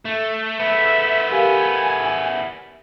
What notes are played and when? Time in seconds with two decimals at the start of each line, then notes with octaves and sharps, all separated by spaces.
0.05 A3
0.59 A3 B3 E5
1.31 G4 A#4 F5 G#5